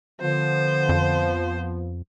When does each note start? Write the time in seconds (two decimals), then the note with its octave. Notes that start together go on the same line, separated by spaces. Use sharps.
0.21 D3 F3 B3 C5
0.89 F2